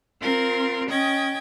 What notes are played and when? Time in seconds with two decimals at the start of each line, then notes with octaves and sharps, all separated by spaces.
0.21 C4 F4 A#4
0.88 C#4 D#5 G5 G#6